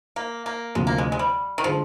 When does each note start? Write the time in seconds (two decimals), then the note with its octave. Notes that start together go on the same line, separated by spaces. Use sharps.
0.16 A#3
0.46 A#3
0.75 D2 C3 F3 G#3
0.87 A#3
0.98 G#3
1.12 G#3
1.19 G3
1.58 D#3
1.64 D3 F3 G#3